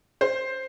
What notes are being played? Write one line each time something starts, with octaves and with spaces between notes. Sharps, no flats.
C5